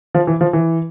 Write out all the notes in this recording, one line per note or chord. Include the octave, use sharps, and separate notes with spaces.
F3
E3
F3
E3